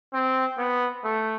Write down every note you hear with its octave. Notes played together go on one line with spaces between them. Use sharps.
C4
B3
A3